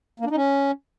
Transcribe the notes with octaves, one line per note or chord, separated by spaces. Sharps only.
A#3
D4
D#4
C#4